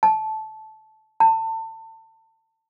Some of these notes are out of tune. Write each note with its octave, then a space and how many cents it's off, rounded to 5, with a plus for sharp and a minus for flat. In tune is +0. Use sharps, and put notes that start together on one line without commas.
A5 -15
A5 +30